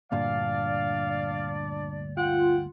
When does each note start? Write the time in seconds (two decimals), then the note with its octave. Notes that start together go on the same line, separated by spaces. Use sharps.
0.12 D2 G2 A#2 D4 D5 F5
2.17 F4 F#5 G5